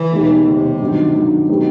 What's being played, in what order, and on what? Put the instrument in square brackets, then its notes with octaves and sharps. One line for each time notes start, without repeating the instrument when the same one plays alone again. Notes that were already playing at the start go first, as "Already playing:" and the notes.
Already playing: [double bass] E3
[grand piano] E1 D#2 D#3 G3
[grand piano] E1 D#2 D#3 G3 [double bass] C3
[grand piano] G2 D#3 F#3
G2 D#3 F#3
C3 F#3 B3 D#4 G4